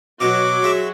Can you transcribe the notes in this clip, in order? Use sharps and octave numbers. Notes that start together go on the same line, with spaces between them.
B2 F#3 F#4 D#5 D6
G#3 E5